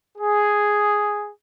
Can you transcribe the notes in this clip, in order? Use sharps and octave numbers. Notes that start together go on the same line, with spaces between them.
G#4